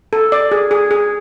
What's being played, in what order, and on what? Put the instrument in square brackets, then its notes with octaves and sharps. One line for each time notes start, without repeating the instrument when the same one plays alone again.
[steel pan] A4
D5
G#4
G#4
G#4